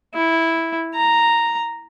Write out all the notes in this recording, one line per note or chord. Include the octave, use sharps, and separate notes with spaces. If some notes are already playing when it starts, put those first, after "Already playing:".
E4
A#5